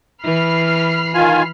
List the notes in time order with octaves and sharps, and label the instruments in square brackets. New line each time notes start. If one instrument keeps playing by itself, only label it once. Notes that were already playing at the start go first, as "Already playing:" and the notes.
[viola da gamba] E3 [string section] B5 F6 C7
[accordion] D#3 F4 G#5